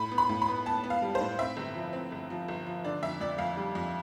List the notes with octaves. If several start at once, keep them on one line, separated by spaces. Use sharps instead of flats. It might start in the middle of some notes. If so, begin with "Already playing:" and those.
Already playing: A2 B5
B3
B5
A2
B5
B3
B3 A5
B3
F5
G3
C5
A2
C4 E5
G1
F3
C4
G1
F3
G1
F3
D3 D5
F2 E5
F2 D5
F2 F5
G3
F2